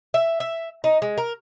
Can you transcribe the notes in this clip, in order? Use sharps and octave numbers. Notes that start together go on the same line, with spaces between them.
E5
E5
D#4
G#3
A#4